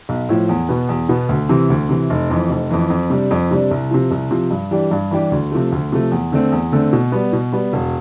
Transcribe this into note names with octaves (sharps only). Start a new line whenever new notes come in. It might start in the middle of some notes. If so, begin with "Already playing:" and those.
B1
A2 F3
E2
B2 B3
E2
B2 B3
D2
C3 E3
D2
C3 E3
F1
F2 E3
F1
F2 E3
F2
C3 G3 D4
F2
C3 G3 D4
C2
C3 F3
C2
C3 F3
G2
E3 G3 D4 G4
G2
E3 G3 D4 G4
D2
C3 F3 A3
D2
C3 F3 A3
E2
D3 A3 C4
E2
D3 A3 C4
B2
G3 B3
B2
G3 B3
E1